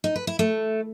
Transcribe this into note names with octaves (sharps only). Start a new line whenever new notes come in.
D#4
B4
E4
A3